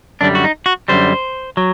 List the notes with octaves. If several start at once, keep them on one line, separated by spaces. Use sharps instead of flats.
F#2 D3 G3 D4
F#4
D#4
F#4
F#2 D3 G3 C5
F#3